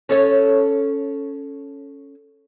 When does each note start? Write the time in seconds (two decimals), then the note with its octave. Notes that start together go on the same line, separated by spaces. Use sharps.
0.09 C#4 A4 C#5